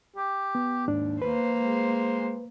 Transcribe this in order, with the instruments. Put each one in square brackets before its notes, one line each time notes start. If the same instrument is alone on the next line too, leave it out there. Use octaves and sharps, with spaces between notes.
[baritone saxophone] G4
[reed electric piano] B3
[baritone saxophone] D#2 [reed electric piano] G#2 D4
[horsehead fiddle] A#3 C5 [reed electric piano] B4
[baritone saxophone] G#3